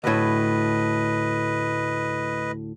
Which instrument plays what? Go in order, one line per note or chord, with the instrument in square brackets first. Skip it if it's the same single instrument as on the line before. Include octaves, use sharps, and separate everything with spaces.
[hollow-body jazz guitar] D2 A2 [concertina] B4 D#5